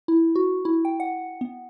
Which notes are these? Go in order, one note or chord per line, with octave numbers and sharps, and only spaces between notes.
E4
F#4
E4
G5
F#5
B3